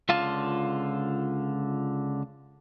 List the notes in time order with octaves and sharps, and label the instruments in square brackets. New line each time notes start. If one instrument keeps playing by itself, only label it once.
[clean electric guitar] C#2 D3 F4 F5 A5